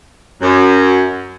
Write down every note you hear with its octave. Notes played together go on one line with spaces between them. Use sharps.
F#2